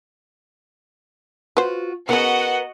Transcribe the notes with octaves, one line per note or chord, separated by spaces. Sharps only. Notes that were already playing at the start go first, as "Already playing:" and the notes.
F4 F#4 B4 C5
C#3 E3 B3 F#4 A#4 D#5 F#5